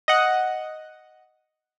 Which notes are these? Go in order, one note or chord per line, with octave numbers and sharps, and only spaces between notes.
D#5 F#5